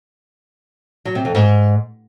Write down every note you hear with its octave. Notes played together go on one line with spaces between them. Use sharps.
F#3
C3
F2
G#2